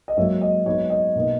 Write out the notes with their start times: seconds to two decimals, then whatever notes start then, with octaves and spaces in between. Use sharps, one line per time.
0.08 D#5
0.17 G#2 F#3 A#3 C#5 E5
0.41 D#5
0.66 G#2 F#3 B3 D#4 C#5
0.90 D#5
1.16 B2 A#3 D#4